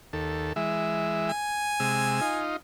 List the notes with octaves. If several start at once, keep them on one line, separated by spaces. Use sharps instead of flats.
D#2 A4
E3 G#3 E5
G#5
C3 G#3 E6
D#4 F4